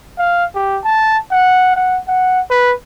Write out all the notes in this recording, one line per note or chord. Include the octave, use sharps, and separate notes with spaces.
F5
G4
A5
F#5
F#5
F#5
B4